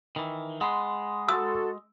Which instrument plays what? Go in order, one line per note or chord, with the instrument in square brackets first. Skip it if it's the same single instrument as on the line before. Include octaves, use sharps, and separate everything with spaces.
[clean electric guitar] D#3 E3
[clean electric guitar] G#3 [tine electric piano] F#5 B5 C6
[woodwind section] F#4 A4 [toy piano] E6